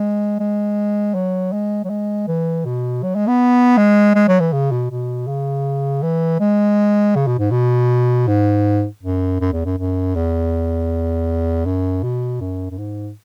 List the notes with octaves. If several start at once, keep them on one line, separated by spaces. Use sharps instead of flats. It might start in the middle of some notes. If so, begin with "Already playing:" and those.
Already playing: G#3
G#3
F#3
G#3
F#3
G#3
E3
B2
F#3
G#3
B3
G#3
G#3
F#3
E3
C#3
B2
B2
C#3
E3
G#3
C#3
B2
G#2
B2
G#2
F#2
F#2
E2
F#2
F#2
E2
F#2
B2
F#2
F#2
G#2